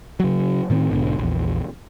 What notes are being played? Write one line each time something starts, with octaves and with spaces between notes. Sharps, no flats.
C#3 F#3
A2 D#3 C4
B1 G#2 B2 D3
A#1 E2